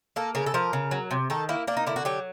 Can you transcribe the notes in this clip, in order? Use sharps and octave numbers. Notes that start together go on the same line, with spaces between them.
A#3 A4
C#3 A#4
A4
F3 A#4
C#3
F#3
C3
D#3 A4
A#3 E4
A#3 D4
D#4
D3 E4
F#4
F#3 G4